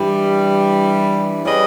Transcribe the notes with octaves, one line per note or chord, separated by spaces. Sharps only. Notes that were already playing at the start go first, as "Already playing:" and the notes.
Already playing: G2 E3 G3
G3 C#4 G#4 B4 D#5